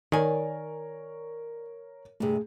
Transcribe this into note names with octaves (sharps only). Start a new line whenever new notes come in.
D#3 A#4 C#5 D5 G#5
G2 C3 A3 G#4